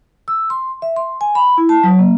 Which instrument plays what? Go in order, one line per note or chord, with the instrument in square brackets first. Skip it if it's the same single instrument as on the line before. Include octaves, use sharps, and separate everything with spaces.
[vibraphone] E6
C6
E5
C6
G#5
B5
E4
A5
F#3
A#3